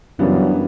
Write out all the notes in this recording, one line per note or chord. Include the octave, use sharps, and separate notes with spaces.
F#2 C#3 E3 G3 B3 D4